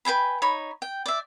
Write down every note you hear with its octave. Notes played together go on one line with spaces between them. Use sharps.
B4 G5 G#5 B5
D#4 C#5 B5
G5
D5 E5